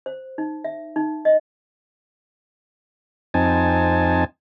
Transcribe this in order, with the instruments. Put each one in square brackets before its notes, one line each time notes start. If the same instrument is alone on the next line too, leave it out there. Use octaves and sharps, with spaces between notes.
[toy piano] C5
D#4
E5
D#4
D#5
[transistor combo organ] F2 C4 D#4 G#5 A5